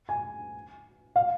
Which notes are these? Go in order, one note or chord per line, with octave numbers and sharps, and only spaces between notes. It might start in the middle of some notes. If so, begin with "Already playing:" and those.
G#5
F5